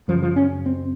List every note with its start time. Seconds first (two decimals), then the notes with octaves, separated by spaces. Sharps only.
0.08 F#2 F3
0.12 C#3
0.22 F3
0.36 C#4
0.66 C4